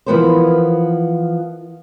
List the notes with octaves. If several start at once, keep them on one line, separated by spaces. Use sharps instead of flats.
E3 F3 A3 B3 A#4 C5